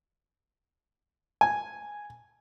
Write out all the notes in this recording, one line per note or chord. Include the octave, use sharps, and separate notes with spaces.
G#5